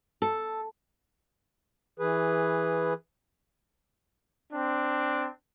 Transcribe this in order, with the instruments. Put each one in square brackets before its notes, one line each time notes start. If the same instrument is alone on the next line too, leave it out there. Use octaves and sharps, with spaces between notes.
[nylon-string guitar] A4
[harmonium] E3 G#4 B4
[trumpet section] C4 D4